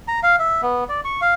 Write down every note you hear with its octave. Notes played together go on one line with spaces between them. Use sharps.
A#5
F5
E5
B3
D5
C#6
F5